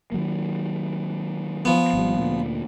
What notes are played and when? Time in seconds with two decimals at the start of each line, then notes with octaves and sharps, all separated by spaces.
0.12 D#3 F#3 A#3
1.65 F3 B3
1.93 G#1 G3
2.17 D2 A#2